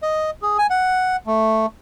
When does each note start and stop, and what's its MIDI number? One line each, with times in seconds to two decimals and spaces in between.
0.02 0.30 75
0.42 0.57 68
0.58 0.67 80
0.70 1.16 78
1.26 1.66 57